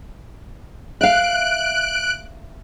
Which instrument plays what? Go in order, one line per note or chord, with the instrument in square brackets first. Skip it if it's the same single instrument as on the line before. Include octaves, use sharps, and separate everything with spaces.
[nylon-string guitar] E5 F5 [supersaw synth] F#6 D7